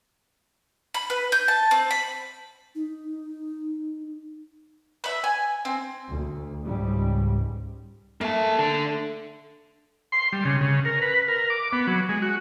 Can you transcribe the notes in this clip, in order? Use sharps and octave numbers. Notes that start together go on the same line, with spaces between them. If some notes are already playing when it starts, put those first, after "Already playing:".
B5
B4
G6
A5
C4
B5
D#4
B4 E5
G#5
C4
D2
C#2 G#2 G3
A3 A#3 A5
D3
C6
G3
C#3
C#3
A#4
B4
A#4
D6
B3
F#3
G#3
F#4